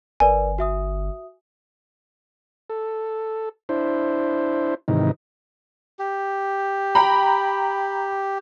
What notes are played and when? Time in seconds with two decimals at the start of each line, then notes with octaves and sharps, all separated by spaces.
0.20 G1 A#4 B4 D5 G#5
0.58 F#4 E5 D#6
2.70 A4
3.69 D4 E4 C5
4.88 G#2 C3 D#3 E3 D#4
5.99 G4
6.95 G5 A#5 B5